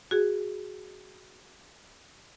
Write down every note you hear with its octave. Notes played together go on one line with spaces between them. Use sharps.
F#4 G#4